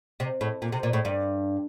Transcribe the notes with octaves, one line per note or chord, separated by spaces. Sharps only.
C3
A2
A#2
C3
A#2
A2
G2